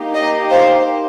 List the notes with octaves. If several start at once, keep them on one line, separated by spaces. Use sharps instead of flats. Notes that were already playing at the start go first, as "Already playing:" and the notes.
Already playing: A#3 D#4 G4
D#5
C5 F5